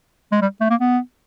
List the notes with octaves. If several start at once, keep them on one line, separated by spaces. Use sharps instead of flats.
G#3
G3
A3
A#3
B3